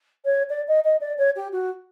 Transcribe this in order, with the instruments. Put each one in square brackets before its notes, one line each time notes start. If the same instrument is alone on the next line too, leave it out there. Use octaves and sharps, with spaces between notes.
[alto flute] C#5
D5
D#5
D#5
D5
C#5
G4
F#4